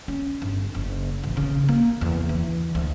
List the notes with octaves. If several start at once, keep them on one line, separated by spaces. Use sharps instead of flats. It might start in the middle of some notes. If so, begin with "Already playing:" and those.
C#4
G1
F#1
A1
C#3
A#3
E2
E3
D2